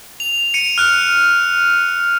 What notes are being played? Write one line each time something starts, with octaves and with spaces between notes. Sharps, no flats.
F7
C#7 D#7
F6 F#6